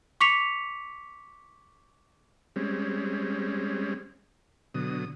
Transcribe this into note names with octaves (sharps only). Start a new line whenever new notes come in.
C#6 D6 B6 C#7 F7
G3 G#3 C4 C#4
B2 D3 F#3 D#6